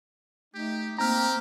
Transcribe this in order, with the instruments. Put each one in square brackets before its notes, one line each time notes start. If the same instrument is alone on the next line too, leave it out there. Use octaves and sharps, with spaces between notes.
[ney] A3 [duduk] D#4 [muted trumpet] G4
[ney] A#3 [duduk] C4 [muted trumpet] G4 [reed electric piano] A#5 F6